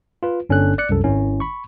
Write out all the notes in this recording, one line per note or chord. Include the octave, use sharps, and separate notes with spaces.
F4 B4
G1 C#4 D4 A4 F#6
D5 F#6 C#7
C2 F#2 A4
G#1 D#3 C#4 E4
B5 C#6